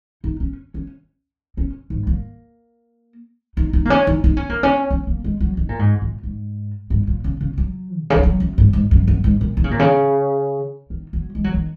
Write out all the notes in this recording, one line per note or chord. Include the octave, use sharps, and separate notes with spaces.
D#4
C#4
C#4
C#4
G#2
A#3
D#4
D#4
A#3
C#4
D#4
D#4
C#4
A#3
C#4
C#4
A#3
G#3
F#3
D#3
A#2
G#2
A#2
G#2
G#2
A#2
C#3
C#3
F#3
A#2
C#3
D#3
F#3
F#2
G#2
G#2
F#2
F#2
G#2
A#2
D#3
C#3
A#2
C#3
D#3
F#3
G#3
F#3
D#3